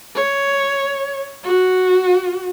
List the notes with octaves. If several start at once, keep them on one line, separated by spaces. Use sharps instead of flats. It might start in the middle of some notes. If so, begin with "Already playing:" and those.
C#5
F#4